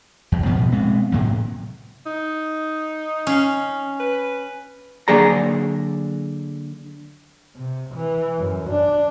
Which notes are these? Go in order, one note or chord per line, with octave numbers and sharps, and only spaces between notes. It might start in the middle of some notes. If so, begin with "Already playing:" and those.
E2
G#2 B2 F3 B3
B2 G#3 B3 C4
A2 C3 F#3 A#3
D#4
C#4 F5
B4
D3 F#3 A#3 G#4 D5 A#5
C3
E3
F#2
D4